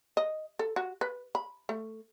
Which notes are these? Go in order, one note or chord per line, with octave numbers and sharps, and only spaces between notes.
D#5
A4
F#4
B4
B5
A3